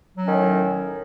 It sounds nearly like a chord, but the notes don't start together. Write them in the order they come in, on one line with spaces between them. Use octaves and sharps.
F#3 C#4 D#3 A2